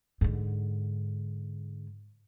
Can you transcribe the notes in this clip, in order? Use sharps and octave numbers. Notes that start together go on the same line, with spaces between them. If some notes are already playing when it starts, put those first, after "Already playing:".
G#2 D3